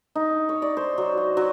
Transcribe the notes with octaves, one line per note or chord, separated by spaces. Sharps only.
D#4
C#5
D5
C5
F#3
F#4
F#3